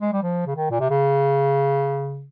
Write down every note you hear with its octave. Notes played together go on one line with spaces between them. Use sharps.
G#3
G3
F3
C#3
D#3
A#2
C3
C#3